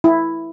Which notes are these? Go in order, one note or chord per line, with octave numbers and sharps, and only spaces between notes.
E4